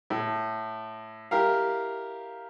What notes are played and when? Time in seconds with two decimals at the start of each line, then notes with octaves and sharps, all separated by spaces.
0.10 A2
1.31 E4 G4 A#4 F5